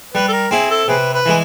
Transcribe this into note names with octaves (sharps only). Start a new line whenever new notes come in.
G3 B4
A4
A#4
C4 E4 G#4
A4
C3 G#4 B4
B4
E3 G#3